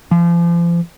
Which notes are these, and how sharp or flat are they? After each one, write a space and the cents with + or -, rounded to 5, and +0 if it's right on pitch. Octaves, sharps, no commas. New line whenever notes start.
F3 -35